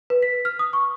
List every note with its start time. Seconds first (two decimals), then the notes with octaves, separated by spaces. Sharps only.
0.10 B4
0.22 B6
0.45 F6
0.59 D#6
0.73 C#6